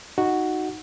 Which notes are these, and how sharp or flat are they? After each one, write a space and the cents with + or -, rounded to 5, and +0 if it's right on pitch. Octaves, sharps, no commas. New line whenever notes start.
D#4 +0 F#4 +0